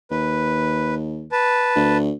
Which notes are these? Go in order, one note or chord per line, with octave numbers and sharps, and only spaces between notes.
D#2 B4
B4 A5
D2